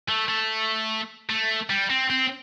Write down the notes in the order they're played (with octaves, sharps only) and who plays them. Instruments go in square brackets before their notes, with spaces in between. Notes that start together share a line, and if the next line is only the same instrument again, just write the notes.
[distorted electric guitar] A3
A3
A3
G3
C4
C4